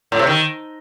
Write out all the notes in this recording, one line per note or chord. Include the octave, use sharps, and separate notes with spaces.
A2
C3
D#3